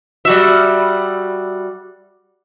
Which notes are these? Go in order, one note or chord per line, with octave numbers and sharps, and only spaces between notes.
G3 F#4 E5